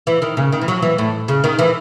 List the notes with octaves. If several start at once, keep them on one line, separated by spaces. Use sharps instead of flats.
E3
D#3
C#3
D#3
E3
F#3
E3
A2
C#3
D#3
E3